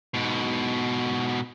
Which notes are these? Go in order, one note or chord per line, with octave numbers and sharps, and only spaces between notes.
G#2 B2